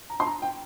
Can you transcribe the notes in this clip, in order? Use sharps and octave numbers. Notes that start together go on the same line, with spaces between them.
A#5
C6
A#5
G5